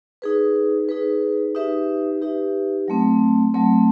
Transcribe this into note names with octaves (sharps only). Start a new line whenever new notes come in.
D#4 G#4 B4
D#4 G#4 B4
D#4 G4 B4 E5
D#4 G4 B4 E5
F#3 A3 C4
F#3 A3 C4